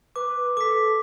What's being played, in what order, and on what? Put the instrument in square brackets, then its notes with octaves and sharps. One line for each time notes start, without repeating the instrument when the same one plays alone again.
[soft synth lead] B4 [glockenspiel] D6
[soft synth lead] A4 [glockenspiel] D6 B6